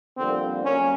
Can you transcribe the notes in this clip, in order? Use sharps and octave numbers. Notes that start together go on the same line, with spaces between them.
F2 D3 G3 A#3 C4
F#3 A#3 C#4